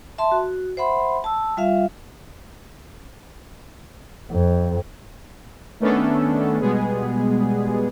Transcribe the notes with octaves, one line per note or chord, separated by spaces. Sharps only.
E5 A5 C6
F#4
C5 E5 F#5 B5 C6
A5 E6
G3 F4 E5 F5
F2
D#3 A3 B3 C#4 D4 A4
B2 G3 G#3 B3 G#4